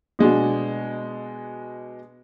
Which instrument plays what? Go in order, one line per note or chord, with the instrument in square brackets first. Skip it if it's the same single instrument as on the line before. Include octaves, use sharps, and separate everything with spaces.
[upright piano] B2 G#3 D4 F#4